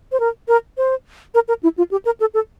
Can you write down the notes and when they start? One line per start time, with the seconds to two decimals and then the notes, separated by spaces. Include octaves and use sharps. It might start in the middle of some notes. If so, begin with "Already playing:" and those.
0.12 C5
0.20 A#4
0.48 A#4
0.77 C5
1.34 A#4
1.48 A#4
1.63 E4
1.78 F4
1.91 G4
2.05 A#4
2.20 A4
2.34 A4